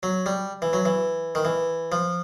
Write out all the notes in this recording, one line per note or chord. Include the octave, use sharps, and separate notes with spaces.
F#3
G3
E3
F#3
E3
D#3
E3
F3